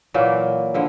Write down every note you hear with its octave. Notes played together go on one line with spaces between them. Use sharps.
A#2 E3 F#3 A#3
D3 F3 E4